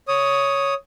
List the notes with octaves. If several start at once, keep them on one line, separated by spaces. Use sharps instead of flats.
C#5 D#6